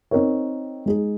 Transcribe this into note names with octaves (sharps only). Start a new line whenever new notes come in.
C4 D#4 A#4 C#5
G#3 D#4 G#4